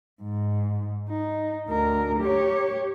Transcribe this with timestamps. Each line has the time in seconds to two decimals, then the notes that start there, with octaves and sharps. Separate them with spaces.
0.22 G#2
1.09 D#4
1.69 D2 A#4
2.20 G4 C#5